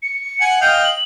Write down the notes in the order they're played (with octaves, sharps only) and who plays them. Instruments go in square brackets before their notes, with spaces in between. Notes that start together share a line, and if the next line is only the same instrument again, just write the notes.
[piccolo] C#7
[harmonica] F#5 G#5
[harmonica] D#5 F5 G5 [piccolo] G6
[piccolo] F#7